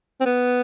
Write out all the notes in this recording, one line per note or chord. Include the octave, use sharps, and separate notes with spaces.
C4
B3